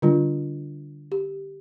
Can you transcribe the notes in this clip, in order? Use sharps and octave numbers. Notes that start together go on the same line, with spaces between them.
D3 G3 D4 F4
G4